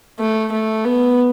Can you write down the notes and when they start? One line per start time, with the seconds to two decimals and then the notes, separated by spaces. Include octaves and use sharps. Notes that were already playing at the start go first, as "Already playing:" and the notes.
0.19 A3
0.52 A3
0.85 B3